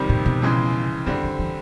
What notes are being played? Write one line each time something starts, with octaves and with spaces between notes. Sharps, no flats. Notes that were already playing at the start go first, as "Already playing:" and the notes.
Already playing: F2 C3 D#3 G3 C4
A#2
B2
F2 C#3 E3 G#3
D3 D#3 G3 C4
E3
E3